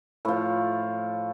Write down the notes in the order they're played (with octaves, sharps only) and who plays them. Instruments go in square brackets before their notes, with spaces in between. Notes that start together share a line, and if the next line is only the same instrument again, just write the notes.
[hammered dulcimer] A2 F3